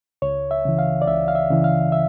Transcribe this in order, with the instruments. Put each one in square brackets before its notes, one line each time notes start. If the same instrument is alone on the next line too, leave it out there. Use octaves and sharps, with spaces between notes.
[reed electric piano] C#2 C#5
E5
C#3 E3
F5
D5
C#2 E5
F5
E5
C#3 E3
F5
E5